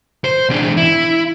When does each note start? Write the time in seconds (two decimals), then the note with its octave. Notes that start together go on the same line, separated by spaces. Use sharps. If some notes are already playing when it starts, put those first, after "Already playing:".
0.24 C5
0.49 E2 D4
0.77 E4